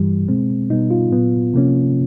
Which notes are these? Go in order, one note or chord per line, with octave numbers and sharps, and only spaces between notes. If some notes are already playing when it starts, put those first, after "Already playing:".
Already playing: G2 E3 G3
B2 G#3 C4
B2 G3 B3 D#4
F4
A#2 F#3 B3
C3 F3 A#3 C#4